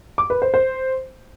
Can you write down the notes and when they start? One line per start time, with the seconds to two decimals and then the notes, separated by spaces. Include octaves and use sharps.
0.18 D6
0.30 B4
0.42 C5
0.54 C5